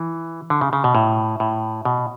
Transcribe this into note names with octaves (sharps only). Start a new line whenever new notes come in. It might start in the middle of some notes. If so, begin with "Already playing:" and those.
Already playing: E3
D3
C#3
C#3
B2
A2
A2
B2